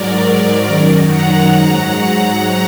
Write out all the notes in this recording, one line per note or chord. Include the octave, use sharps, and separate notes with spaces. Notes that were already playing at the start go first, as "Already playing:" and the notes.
Already playing: G#2 F#3 A#4 D5
F#2 D#3 F#3
F#5 A#5
G#2 F#3